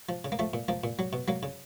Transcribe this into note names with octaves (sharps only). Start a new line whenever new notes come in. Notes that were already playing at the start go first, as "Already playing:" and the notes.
F3
C#3
A#3
F3 A3
A#2
F3 A#3
A#2
F#3
B2
F#3 A#3
C#3